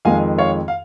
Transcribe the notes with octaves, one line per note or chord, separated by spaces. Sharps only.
F2 D#3 G#3 F5 G#5
C#5 F5
F5